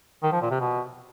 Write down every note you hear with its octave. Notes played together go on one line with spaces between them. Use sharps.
D#3
F3
A#2
C3
B2